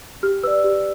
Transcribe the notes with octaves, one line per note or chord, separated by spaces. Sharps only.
G4 F6
B4 D5 E6
G4